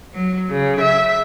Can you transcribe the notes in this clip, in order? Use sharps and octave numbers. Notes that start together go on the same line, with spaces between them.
F#3
C#3
E5